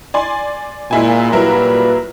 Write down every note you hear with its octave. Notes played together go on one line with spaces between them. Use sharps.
D5 G#5 C6
A#2 G#3 E4 G#5
A#2 F#3 G3 E4 A#4 B4